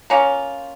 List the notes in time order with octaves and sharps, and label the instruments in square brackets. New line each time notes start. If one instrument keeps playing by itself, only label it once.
[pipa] A#3 C#4 F4